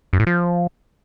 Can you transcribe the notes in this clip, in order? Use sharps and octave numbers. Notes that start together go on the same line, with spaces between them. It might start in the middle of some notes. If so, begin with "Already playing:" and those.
F#2
A2
F3